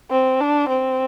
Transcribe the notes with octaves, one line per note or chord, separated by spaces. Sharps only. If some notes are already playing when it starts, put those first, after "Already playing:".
C4
D4
C4